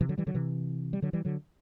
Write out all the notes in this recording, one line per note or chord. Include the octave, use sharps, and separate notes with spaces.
C3 E3
D3 F#3
E3 G3
D3 F#3
C3 E3
G3
D3 F#3
E3 G3
D3 F#3